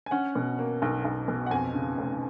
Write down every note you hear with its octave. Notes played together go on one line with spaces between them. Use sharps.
G#5
C#4 F#5
B2
A#3
B1
B1
B2
F#5
F2 G#5
C#3
F1